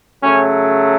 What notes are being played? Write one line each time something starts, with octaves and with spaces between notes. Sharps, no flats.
C#3 F#3 A3 C#4